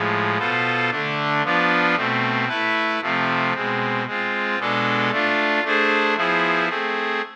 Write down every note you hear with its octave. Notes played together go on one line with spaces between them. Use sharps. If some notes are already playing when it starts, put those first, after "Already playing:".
Already playing: A2 F3 G#3
B2 B3 F4 A4 C5
D3 A3 D4
F3 B3 D4 F4
B2 A3 C4
A3 E4 B4
C3 F3 A3 C4
B2 G#3 C4
G#3 C4 F4
B2 G#3 D4 A4
A3 D4 F4
A3 D4 G#4 C5
F3 B3 E4 G#4 C5
A3 C4 G#4